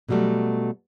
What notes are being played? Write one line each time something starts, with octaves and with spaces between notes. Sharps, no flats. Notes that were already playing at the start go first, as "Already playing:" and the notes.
B2 D3 F#3 G3 A3